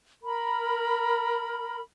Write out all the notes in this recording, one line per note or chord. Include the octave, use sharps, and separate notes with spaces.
A#4 B5